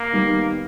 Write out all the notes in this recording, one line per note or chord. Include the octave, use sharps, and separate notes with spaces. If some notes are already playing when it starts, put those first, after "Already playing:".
Already playing: A#3
D#3 G3 B3